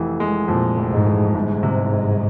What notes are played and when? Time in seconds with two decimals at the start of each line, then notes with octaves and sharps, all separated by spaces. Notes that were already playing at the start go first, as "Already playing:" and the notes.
Already playing: F1 E3
0.20 G#3
0.48 F2 A#2
0.77 F1
0.92 G#2
1.06 E3
1.35 G1 G#2
1.63 C3
1.93 G1